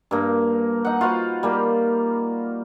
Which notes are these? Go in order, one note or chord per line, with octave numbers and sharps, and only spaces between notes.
G2 A#3
D#4 F#5
F4 F#4 B4 C5
G3 A#3 B5